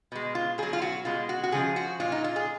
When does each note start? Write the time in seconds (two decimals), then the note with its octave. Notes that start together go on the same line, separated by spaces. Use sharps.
0.12 B2 G#3
0.35 F4
0.58 B2 F#3 G#4
0.73 F4
0.82 F#4
1.05 B2 G#3 F4
1.29 F#4
1.43 F#4
1.52 C#3 F3 G#3 G#4
1.76 F#4
2.00 A#2 G#3 F4
2.12 D#4
2.24 F4
2.36 G#4